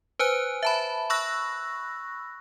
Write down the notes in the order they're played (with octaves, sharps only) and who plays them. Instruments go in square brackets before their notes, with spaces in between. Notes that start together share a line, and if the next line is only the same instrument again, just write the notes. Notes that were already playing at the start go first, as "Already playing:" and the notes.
[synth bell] B4 C5 G#5 F#6
E5 A5 B5
B5 C#6 E6 F#6 A#6